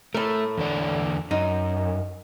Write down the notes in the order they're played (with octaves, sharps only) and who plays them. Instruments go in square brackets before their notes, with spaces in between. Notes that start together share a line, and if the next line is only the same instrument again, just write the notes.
[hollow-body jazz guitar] A2 A#4 [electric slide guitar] A3
[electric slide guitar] E2 D3 D5
[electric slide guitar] F#2 [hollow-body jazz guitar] D#4